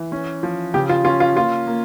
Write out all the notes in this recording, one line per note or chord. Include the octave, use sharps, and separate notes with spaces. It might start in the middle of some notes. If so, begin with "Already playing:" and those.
Already playing: E3
C#4
F3
C#3 G4
F4
C#4 F4
F4
A#3 F4
A#3